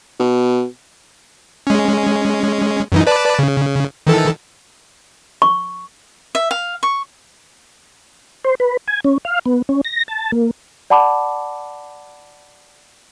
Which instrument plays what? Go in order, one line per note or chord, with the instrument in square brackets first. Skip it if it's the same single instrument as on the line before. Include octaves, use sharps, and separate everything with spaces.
[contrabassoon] B2
[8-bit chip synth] G#3 C#4
F#2 E3 D#4
B4 D5 A5
C#3
D#3 E3 A4
[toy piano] C#6
[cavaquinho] E5
F5
C#6
[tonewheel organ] C5
B4
G#5
C#4
F5
B3
C#4
A#6
A5
A#3
[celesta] D5 F#5 A5 B5 D6